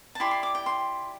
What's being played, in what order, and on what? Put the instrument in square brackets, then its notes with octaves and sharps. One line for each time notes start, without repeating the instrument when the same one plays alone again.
[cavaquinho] A5
E4 G4 D5 C6
C6
D6
G5
C6